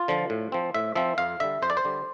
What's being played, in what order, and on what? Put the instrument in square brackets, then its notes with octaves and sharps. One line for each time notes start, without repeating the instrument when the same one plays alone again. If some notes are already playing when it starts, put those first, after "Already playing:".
Already playing: [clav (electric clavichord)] F4
D3 F3
A2
F3 C4
A2 E5
F3 C4 E5
F2 F5
D3 G3 E5
F2 C5
D5
C5
D3 G3